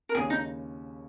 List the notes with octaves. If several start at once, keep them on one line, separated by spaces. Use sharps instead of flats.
A#4
D#2 C#3 G#3 C#4 G#4
D#4